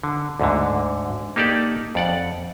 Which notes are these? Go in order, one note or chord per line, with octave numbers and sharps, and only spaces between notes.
D3
D2 G#2 D3
A#3 D#4 G4 A4 D5
F2 D5 F#5